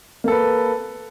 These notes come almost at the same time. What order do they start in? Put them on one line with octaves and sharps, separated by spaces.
A#3 A4 B4